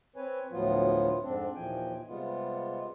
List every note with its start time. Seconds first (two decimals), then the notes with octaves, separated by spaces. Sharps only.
0.16 C4 B4 C#5 G#5
0.52 D2 A2 F3 F#3 B3 F4
1.23 F2 G#2 C4 D4
1.55 D#2 A#2 E3 F3 G5 G#5
2.08 C3 G3 G#3 B3 F4